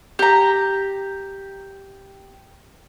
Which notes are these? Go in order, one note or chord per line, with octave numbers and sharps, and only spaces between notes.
G4 A#5